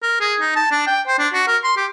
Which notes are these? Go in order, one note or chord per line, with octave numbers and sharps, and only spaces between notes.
A#4
G#4
D#4
A5
D4
G5
C5
D4
F#4
A#4
C6
G4